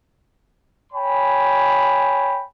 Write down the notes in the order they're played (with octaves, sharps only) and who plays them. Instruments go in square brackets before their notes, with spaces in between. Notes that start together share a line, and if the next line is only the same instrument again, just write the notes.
[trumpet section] C#5 G5 G#5 B5